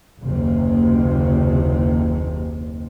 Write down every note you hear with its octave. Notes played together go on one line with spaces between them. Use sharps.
F#1 D#2 C3